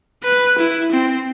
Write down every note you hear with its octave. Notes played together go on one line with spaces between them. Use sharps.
B4
E4
C4